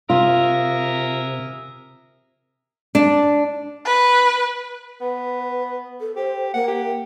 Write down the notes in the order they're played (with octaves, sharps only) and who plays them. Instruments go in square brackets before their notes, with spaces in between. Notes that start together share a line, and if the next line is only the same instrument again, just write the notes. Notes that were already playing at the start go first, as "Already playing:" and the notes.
[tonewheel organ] C3 [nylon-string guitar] F4 [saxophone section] G#4 A#4 E5
[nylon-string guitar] D4
[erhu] B4
[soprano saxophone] B3 [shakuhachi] B4
[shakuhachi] A4
[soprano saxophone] G4 [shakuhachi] C5
[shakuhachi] A#3 [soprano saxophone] F#5
[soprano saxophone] G4